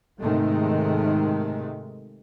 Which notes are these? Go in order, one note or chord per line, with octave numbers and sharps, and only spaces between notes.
G#2 C3 D#3 G#3 A3